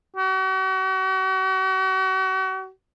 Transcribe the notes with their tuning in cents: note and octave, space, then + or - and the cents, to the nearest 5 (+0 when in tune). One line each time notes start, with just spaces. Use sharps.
F#4 +40